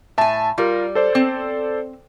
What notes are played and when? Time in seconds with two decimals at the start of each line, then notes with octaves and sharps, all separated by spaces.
0.18 A2 E5 G#5 A5
0.58 G3 F4 A#4
0.95 A4 C5 D5
1.15 C4